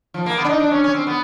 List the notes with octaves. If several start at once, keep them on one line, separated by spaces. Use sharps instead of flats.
F3
A#3
B3
D4
D#4
D4
C#4
C#4
C4
B3